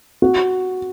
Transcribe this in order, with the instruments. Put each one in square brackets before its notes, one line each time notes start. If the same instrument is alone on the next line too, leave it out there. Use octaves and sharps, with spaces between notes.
[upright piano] F#4